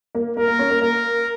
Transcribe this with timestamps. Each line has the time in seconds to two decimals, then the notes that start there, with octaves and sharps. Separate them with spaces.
0.15 A#3
0.37 A#3 A#4
0.48 A#3
0.59 C#4
0.70 A#3
0.81 A#3 A#4